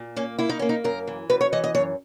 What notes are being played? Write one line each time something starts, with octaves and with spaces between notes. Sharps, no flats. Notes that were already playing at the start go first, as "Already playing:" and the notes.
Already playing: A#2
A#3 C#4
A#3 E4
D#4
A#3 C#4
D#4
F#2 A#4
E3
F#2 B4
C#5
E3 D#5
D#5
F#2 C#5